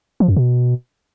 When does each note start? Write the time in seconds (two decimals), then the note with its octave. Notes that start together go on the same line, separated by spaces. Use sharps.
0.20 F3
0.28 F#2
0.36 B2